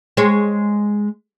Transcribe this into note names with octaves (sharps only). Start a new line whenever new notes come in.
G#3 C#5